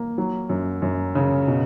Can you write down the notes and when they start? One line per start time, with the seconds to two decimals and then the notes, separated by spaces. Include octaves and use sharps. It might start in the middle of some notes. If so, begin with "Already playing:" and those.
Already playing: A#3
0.18 F#3
0.49 F#2
0.82 F#2
1.15 C#3
1.48 B2